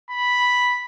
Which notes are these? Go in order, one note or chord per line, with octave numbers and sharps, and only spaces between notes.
B5